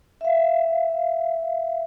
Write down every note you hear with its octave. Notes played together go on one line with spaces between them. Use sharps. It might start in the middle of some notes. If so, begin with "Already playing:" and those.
E5 F5